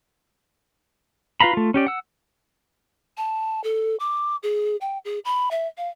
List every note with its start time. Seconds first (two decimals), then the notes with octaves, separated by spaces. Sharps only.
1.40 F4 B4 F5 A#5 B5
1.53 A3 F4
1.74 C#4 G4 D5
1.87 F#5 E6
3.17 A5
3.64 A4
4.00 D6
4.43 G#4
4.81 G5
5.05 G#4
5.25 B5
5.51 E5
5.78 F5